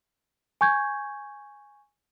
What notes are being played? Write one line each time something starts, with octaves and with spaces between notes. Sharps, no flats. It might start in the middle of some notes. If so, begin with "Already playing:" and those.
G#5 C#6 G6 G#6